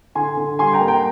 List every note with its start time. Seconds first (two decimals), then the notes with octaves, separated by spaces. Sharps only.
0.15 D3 G#5 C6
0.37 D3
0.59 G3 G#5 C6
0.73 G5 A#5
0.81 A#3
0.88 G5 A#5